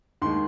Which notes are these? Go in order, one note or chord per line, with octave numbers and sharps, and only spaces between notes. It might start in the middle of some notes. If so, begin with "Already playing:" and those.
D#2 D#3 G#3 C6